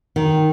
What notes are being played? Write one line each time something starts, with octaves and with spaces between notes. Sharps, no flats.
D#3